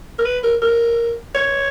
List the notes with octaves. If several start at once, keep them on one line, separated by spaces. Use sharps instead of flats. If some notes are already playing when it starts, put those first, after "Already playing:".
A#4
B4
A#4
A#4
C#5